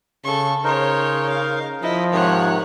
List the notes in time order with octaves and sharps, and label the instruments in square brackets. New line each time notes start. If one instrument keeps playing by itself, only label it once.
[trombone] C#3 [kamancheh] A4 C#6
[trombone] C#3 [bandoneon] D#4 A#4 [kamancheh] C5 C#5
[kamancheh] F5
[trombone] F3 [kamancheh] E4 D#5
[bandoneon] G#2 C3 D#3 [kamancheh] C#5 F#5